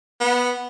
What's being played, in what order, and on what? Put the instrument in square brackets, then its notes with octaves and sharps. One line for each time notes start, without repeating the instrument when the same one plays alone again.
[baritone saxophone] B3